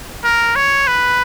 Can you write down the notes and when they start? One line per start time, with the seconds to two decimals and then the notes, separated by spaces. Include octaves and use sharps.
0.24 A#4
0.56 C#5
0.88 B4